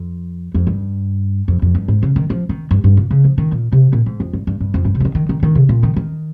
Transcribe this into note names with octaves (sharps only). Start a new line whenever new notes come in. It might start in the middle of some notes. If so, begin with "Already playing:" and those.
Already playing: F2
F2
G2
F2
F2
G2
G#2
C#3
D#3
F3
D#3
G2
G2
A#2
C#3
F3
D#3
A#2
C3
A#2
G#2
F2
G2
G2
G2
F2
G2
C3
F3
D#3
D#3
D#3
D#3
C3
A#2
D#3
D#3